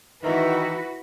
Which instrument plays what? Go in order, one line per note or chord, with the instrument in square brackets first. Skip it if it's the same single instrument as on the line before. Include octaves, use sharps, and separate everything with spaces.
[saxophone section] D#3 E3 [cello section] E4 F#4 B4